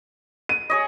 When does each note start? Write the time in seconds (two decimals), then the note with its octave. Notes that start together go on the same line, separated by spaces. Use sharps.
0.49 D#7
0.70 G#4 C#5 D#5